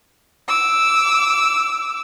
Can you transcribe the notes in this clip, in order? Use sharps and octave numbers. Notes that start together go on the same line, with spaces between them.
D6 E6